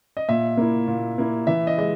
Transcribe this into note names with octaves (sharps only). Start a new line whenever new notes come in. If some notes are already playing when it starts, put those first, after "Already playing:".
D#5
A#2 E5
A#3 E4
A#2
A#3 E4
E3 E5
D#5
G#3 D#5